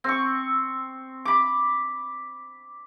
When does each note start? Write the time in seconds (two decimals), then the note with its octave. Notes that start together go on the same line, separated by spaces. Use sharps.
0.04 C4 C#6
1.25 B5 D6